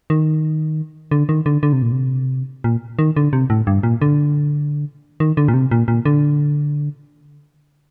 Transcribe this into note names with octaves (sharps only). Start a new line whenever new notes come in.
D#3
D3
D#3
D3
D3
C3
A#2
C3
A#2
D#3
D3
C3
A2
G2
A#2
D3
D#3
D3
A#2
C3
A#2
A#2
D3